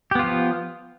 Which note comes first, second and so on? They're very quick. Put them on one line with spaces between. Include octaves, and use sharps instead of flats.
G4 B3 F4 F3